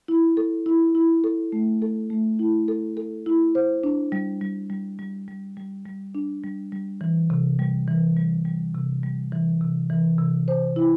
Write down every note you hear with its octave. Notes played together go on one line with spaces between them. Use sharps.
E4
A4
E4
E4
A4
A3
A4
A3
E4
A4
A4
E4
C5
D4
G3
G3
G3
G3
G3
G3
G3
D4
G3
G3
E3
C3
G3
E3
G3
G3
C3
G3
E3
C3
E3
C3
C5
E4